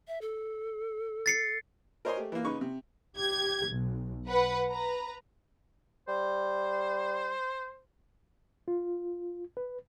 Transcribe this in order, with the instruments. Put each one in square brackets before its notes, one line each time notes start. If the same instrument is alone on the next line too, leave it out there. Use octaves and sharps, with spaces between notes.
[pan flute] E5
A4
[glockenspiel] A6 C7 C#7
[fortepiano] A#4 C5 C#5 D#5 G#5 C6
A3 G4
E3 A#3
C#3 D#4 B4 C#6
C3
[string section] G4 G#6
B1
B4 F#5
B4 A#5
[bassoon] G3 [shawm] C5
[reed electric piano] F4
B4